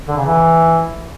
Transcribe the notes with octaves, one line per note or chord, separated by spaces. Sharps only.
D3
C#3
E3